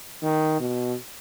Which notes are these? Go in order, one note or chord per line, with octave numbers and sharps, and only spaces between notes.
D#3
B2